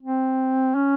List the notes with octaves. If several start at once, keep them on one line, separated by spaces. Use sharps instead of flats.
C4
C#4